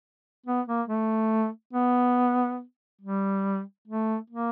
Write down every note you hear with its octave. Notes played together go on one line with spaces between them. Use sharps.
B3
A#3
A3
B3
G3
A3
A#3